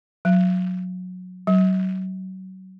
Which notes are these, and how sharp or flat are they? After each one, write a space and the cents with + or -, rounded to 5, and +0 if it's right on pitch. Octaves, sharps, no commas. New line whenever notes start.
F#3 -20
F#3 +25